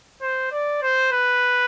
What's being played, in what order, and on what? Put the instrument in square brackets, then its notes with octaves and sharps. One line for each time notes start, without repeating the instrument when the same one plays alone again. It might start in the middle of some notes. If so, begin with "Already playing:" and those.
[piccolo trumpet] C5
D5
C5
B4